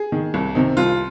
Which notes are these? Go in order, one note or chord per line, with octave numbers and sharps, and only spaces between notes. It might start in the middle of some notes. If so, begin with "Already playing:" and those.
Already playing: G#4
D#3
C2
C3 D#3
C2 F4